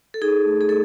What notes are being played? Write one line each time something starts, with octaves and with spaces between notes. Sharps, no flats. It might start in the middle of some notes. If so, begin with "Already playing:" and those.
A4
D#4 G#4
A3
G#4
A3 A4